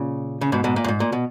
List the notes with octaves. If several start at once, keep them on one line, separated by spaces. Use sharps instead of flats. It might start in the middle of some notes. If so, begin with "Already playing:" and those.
Already playing: A#2 C#3
C#3
G#2 B2
G#2 B2
A#2
F#2
G#2
A#2
B2